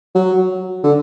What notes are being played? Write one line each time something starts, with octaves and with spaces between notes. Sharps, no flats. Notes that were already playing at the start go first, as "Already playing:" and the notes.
F#3
D3